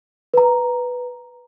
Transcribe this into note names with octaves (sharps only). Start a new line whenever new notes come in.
B4 A#5